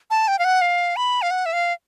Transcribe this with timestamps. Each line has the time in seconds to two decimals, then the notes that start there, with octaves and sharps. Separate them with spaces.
0.10 A5
0.28 G5
0.39 F5
0.45 F#5
0.61 F5
0.96 B5
1.22 F5
1.31 F#5
1.46 E5
1.53 F5